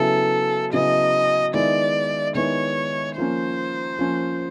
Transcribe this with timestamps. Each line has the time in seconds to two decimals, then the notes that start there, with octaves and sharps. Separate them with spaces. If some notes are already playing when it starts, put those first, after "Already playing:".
Already playing: C#3 F#3 B3 E4 A4
0.73 C#3 F#3 B3 E4 D#5
1.54 D#3 G#3 B3 E4 D5
2.35 D#3 G#3 B3 E4 C#5
3.17 F3 A#3 C#4 C5
3.99 F3 A#3 C#4